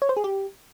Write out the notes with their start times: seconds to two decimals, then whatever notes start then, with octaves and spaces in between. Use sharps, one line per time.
0.02 C#5
0.09 C5
0.17 G#4
0.24 G4